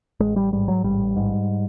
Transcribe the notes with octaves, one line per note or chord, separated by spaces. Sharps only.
A1 G#3
G3
G#2 G3
F#3
A1 G3
G#2